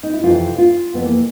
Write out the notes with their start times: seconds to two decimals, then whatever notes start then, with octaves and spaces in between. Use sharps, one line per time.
0.03 D#4
0.13 E4
0.23 F2 C3 E3 F4
0.58 F4
0.94 F2 C3 E3 B3
1.05 A#3